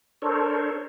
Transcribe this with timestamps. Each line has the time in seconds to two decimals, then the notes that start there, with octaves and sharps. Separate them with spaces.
0.22 D4 A4 A#4 C5 C#5